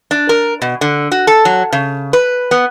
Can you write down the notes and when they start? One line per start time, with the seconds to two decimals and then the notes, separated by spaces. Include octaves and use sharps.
0.11 D4
0.29 A#4
0.62 B2
0.81 D3
1.12 F#4
1.27 A4
1.45 F#3
1.73 C#3
2.13 B4
2.51 B3